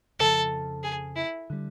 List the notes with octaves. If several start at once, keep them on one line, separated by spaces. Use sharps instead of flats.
F2 C#3 F3 A4
G#4
E4
D3 G3